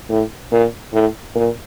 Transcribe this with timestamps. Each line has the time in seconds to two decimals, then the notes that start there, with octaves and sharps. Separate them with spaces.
0.09 A2
0.52 A#2
0.93 A2
1.35 A#2